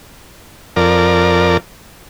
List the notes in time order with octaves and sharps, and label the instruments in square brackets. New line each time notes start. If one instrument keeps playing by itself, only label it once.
[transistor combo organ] F2 A#4 D5